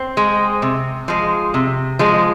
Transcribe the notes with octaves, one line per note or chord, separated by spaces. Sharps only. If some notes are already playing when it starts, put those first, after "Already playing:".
Already playing: C4
G#3
C3
F3 G#3
C3
F3 G#3